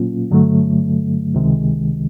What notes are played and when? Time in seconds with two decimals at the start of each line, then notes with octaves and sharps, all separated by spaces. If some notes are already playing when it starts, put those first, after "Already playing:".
Already playing: A#2 F#3 A#3 C#4 F4
0.31 G2 D3 F#3 A3
1.34 C#2 C3 D#3 G#3